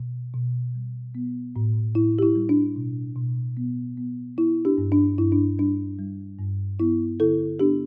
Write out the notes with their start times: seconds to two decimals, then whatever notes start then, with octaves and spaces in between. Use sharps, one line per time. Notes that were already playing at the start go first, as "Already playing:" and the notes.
Already playing: B2
0.34 B2
0.75 G3
1.15 B3
1.56 A2
1.95 A2 E4
2.19 G4
2.23 E4
2.36 G3
2.49 D4
2.76 B2
3.16 B2
3.57 B3
3.97 B3
4.37 B3 E4
4.65 D4 G4
4.78 G2
4.92 D4
5.18 G2 E4
5.32 D4
5.58 G3 D4
5.99 G3
6.39 G2
6.80 B3 E4
7.20 D3 E4 A4
7.60 B3 D4 G4